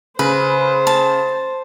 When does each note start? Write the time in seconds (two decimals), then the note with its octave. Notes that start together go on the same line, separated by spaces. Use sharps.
0.19 C#3 B4 C5
0.87 A5